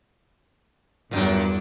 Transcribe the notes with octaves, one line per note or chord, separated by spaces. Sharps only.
E2 G2 A#2 F#3 D4